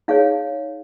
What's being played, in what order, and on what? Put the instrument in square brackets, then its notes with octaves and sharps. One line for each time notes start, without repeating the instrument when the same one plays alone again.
[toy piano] D#4 G#4 C#5 F5